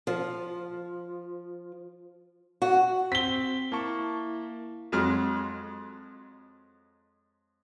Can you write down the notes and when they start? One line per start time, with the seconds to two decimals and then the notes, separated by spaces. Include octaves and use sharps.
0.07 F3
2.62 F#4
3.12 C4 B6 G7
3.72 A#3 E4 A5 C#6
4.92 F2 F#3 G#3 F6